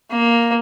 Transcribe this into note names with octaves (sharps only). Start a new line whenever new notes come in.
A#3